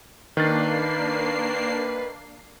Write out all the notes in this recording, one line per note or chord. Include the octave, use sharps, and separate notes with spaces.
D#3 A#3 D4 B4 F6 A6 C7